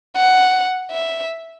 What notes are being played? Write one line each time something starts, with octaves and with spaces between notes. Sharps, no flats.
F#5
E5